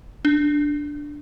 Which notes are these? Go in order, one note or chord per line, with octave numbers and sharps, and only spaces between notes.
D4